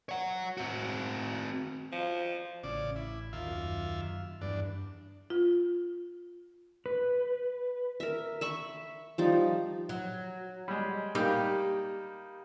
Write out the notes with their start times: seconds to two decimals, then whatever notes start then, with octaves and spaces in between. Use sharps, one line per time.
0.09 C#5 F#5
0.58 C4 F#4
1.92 F3
2.64 A1 C#3 D5
2.96 E4
3.33 D#2 F4 E5
3.47 F#2
4.41 E2 G2 D4
5.30 F4
6.86 B4
8.00 A#4 E5
8.41 E5 B5 C#6
9.18 F3 G3 D#4
9.89 F#3
10.68 G3 G#3
11.15 G3 A#3 D#4 G4